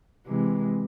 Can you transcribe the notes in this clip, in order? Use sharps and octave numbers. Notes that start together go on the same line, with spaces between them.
C3 E3 G#3